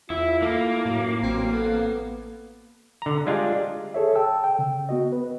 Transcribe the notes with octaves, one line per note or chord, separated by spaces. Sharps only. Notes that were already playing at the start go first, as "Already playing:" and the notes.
E2 E4 F4
A3 A#3 E4
F#2 A2
A1 F#3 C4
B3 A4
D3 A#5
G3 G#3 D4 F4
G#4 A4 C#5 E5
G5 A5 E6
G5
C#3
B3 F#4 D#5
B4